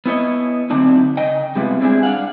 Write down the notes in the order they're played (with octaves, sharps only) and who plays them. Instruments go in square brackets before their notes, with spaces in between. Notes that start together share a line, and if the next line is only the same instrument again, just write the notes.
[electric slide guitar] B3 E4 C#5 D#5
D3 F#3 A3 C4 D4 D#4
C#3 D#5 G5
C3 G3 G#3 B3 E4 F4
G3 G#3 C4 D4 E4 G#4
D4 F5 F#5